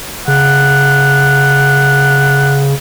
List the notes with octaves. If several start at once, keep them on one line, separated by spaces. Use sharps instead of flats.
C#3 F#5